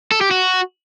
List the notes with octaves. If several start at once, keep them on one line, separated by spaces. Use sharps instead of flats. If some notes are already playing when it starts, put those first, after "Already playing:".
A4
G4
F#4